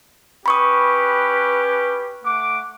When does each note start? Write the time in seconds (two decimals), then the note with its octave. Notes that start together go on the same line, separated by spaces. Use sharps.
0.46 C#4 G4 B4 B5 C#6 D#6
2.22 A3 F#5 D6